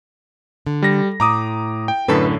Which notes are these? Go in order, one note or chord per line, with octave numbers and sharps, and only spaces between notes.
D3
G3 A#6
A2 A#5 D6 D#6
G5
F#2 A2 D3 A4 B4